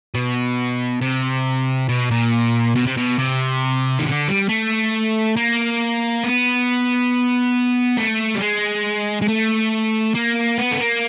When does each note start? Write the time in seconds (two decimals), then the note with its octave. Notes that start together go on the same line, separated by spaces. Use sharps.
0.15 B2
1.01 C3
1.89 B2
2.11 A#2
2.76 B2
2.87 C3
2.97 B2
3.19 C3
3.99 D#3
4.06 D3
4.28 G3
4.49 A3
5.37 A#3
6.24 B3
7.97 A3
8.35 G3
8.41 G#3
9.22 G#3
9.28 A3
10.15 A#3
10.58 B3
10.72 A3
10.80 A#3